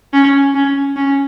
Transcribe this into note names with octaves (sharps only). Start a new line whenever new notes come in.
C#4
C#4
C#4